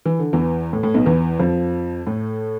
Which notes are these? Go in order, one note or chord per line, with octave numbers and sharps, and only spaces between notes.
E3
D3
E2 E3
A2
A2
B1 B2
E2 E3
F2 F3
A2 A3